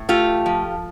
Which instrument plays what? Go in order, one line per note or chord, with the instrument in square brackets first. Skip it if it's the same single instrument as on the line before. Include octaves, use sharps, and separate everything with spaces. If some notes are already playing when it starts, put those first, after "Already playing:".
Already playing: [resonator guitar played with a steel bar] A2
A3 F4 G4
F3